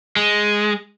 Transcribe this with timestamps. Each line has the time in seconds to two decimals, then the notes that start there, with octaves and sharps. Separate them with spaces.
0.16 G#3